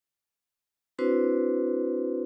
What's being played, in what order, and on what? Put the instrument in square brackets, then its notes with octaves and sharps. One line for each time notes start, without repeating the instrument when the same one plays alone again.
[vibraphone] C4 D4 E4 F#4 B4 C5